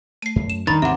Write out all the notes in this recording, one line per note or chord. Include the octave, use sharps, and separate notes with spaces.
A3 C7 D#7
F#2
E7
E2 D#3 G3 D4 A#5 B5 A6
D#2 G#2 C3 E3 E5 F#5